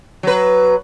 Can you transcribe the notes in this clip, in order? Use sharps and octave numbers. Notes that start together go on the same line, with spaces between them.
F#3 B4